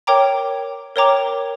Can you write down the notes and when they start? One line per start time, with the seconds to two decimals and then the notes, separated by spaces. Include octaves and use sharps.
0.07 A#4 C#5 G5 A#5 D6
0.96 A#4 C#5 G5 A#5 D6